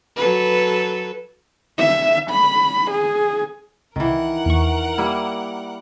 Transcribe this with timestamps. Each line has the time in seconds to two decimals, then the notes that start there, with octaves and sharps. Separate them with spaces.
0.16 F#3 A4 B4
1.79 E5
2.30 B5
2.90 G#4
3.96 C#2 D#3 E3 A#4 F#5
4.46 E2 C#6
4.98 G3 A#3 E4